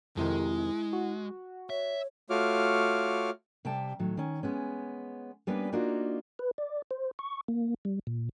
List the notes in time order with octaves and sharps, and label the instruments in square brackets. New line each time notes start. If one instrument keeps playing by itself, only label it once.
[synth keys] F2 C3 D#3 [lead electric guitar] G#3 [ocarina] E4
[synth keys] F#4
[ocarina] C#5 [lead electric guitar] E5
[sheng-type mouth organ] A3 F4 F#4 C#5 D6 F6
[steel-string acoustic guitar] C3 G3 E5 G5 A5
A2 D#3 F#3
D#3 C#4
G#3 B3 C#4
G3 A#3 B3 C#4 D4 B4
A#3 D4 D#4 F4 F#4 A#4
[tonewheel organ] B4
D5
C5
C#6
A#3
G3
A#2